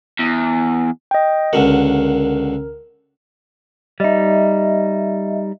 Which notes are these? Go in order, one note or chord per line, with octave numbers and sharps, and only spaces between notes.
E2
D#5 G5
C#2 D3 F#4 A#4
G3 D#4 D#5 E5